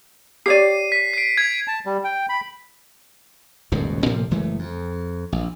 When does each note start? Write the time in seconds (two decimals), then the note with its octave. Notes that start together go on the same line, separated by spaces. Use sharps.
0.46 G4 C#5 D5 C7 D#7
0.92 B6
1.14 C7 D7
1.38 G#6
1.68 A5
1.86 G3
2.04 G5
2.29 B5
3.72 D#1 C#2 F#2 B2
4.05 A2 C3 F3 A#3
4.31 F#1 E3 G#3 A3
4.59 F2
5.32 A#1